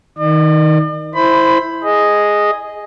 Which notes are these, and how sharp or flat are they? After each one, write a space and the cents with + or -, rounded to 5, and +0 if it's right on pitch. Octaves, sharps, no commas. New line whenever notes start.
D#3 +15 D5 +45
E4 +0 C5 +0 B5 +15
G#4 +0 D#5 +0